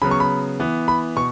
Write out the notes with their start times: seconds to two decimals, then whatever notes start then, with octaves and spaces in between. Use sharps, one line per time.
0.02 C#3 F#3 B3 B5
0.11 C#6
0.20 B5
0.60 E3 B3
0.88 B5
1.16 B2 C#6